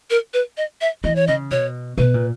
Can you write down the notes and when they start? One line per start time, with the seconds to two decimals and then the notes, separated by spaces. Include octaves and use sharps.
0.10 A#4
0.34 B4
0.57 D#5
0.81 E5
1.04 E3 D#5
1.16 C#5
1.27 C#3 D#5
1.51 B2 C#5
1.98 B2 B4
2.14 A#2